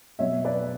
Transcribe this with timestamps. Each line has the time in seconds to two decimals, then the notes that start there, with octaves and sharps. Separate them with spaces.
0.19 B2 F#3 B3 C#5 E5
0.45 B4 D5